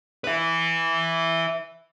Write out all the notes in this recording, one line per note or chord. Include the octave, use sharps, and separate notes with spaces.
B4 E5